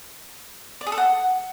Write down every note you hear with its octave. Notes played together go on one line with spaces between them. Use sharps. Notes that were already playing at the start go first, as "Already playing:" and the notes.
D5
G#4
A4
F#5